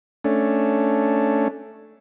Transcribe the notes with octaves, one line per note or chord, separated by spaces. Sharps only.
A3 C#4 D4